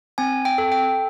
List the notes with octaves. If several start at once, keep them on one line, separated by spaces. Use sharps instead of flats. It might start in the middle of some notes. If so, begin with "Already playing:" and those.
C4 G#5
G5
A4
G5